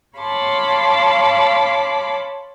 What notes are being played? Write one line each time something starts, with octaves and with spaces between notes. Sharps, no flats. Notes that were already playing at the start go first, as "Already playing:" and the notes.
C#5 F5 A5 B5 C6 D6